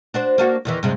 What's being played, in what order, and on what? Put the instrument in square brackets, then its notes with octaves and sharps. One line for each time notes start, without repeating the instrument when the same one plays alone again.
[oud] D4 F#4 C5
A#3 D4 F#4
E2 D#3 E3
G2 C3 G#3